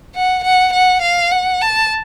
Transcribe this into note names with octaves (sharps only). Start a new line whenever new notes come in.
F#5
F#5
F#5
F5
F#5
A5